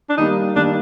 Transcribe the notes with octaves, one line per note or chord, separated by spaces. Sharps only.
D4
D#3 G3 A#3 D#4
D#3 G3 A#3 D4